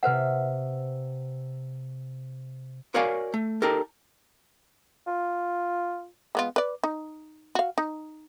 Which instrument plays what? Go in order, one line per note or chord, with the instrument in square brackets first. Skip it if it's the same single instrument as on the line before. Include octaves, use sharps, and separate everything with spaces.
[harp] C3 E5 [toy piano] B4 C5 F#5
[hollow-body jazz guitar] F#4 A#4 C#5 D5 F5 G#5
A3
D#4 G4 A4 A#4
[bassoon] F4
[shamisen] G#3 B3 F4
B4 D5
D#4
F#4 F5
D#4